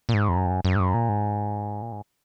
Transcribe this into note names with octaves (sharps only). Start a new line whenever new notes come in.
A#2
G#2
F2
F#2
F2
F#2
F#2
G#2
F#2
A#2
G#2
A#2
G#2